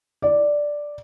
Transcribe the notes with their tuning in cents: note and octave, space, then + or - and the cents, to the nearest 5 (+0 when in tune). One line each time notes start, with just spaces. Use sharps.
D5 +0